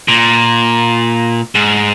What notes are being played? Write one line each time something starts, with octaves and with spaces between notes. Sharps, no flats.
A#2
G#2